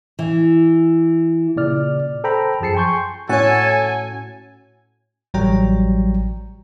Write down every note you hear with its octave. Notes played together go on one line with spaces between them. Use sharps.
E3
A#2 C#3 D5 F6
A4 C5 G5 A#5 B5
F#2 F3 G#4 A5 C7 C#7
G5 G#5 C6 C#6 G6
A2 C#4 F#4 A4 C#5 F#5 G#5
A1 F#3 G3 C#5 G5 A#5